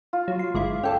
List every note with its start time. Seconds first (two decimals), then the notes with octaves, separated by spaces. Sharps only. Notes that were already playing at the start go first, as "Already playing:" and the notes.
0.13 F4
0.28 F#3
0.39 C6
0.54 G1 G#3 E4 D6
0.83 C#4 A4 D5 G5